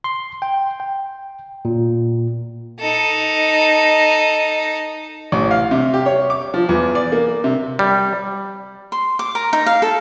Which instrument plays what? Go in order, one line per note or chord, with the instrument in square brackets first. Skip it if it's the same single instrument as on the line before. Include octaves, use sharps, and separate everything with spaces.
[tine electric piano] C6
G5
G5
A#2
[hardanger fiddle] D#4 A4
[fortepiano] A1
F5
C3
G4
C#5
D6
F3
E2
D5
A#3
C3
[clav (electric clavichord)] G3
[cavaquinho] C6
D6
A#4
D#4
F5
A4